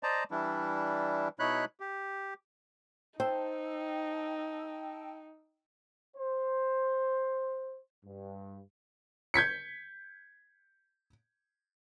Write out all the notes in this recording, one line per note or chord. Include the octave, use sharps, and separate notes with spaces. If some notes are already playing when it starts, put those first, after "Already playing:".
C5 D5 D#5 A5 A#5
E3 G3 D4 E4
B2 D#4 E4 C#5 B5 F#6
G4
D#4 C5 G5 A5 E6
C5
G2
G6 G#6 B6 C#7